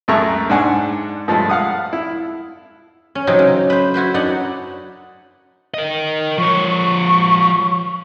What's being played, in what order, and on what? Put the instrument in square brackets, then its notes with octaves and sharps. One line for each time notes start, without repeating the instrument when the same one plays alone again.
[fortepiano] C#2 F#2 A3 E5 A#5 C#6
G#2 D4 F#5 G#5
G2 F3 G#3 A3
F5 F#5 D#6
E4
[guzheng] C#4
C3 F#3 C4 D#4
C#3
B4 C5
E4 F#4 B4 C5
F#2 D4 D#4 F#5
[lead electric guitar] A#4 D#5
[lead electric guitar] F3 C#5 [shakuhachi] C#6